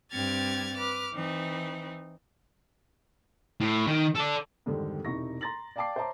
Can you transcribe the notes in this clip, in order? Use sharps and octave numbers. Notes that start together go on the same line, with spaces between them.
G2 C4 G4 F6 G#6 A6
B4 D6 F6
E3 C4 D#4
A2
D#3
A4 D5
F2 G#2 D3 D#3 G3 C4
E1 C3 D#4 E4 C#6 A#6
A#5 C6 A6 A#6 F#7
D5 F5 G5 A5 D6 C7
C5 C#5 E5 A5 A#5 D6